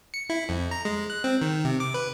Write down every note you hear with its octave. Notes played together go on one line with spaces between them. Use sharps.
C#7
E4
F2
A#5
G#3
F#6
C4
D#3
C3
D6
B4